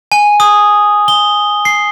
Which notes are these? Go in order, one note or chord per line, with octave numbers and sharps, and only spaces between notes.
G#5
D#6
G7
C7